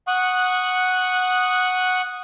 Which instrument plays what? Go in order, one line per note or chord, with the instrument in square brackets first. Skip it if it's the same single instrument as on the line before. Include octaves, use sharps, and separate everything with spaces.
[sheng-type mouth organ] F#5 C#6 D#6 F#6